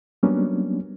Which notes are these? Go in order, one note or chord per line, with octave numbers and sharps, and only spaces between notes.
F#3 G3 A#3 B3 C#4 D4